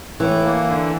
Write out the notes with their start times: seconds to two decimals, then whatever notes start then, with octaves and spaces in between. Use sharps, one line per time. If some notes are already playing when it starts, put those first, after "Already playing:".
0.20 A2 E3
0.44 A#3
0.68 D3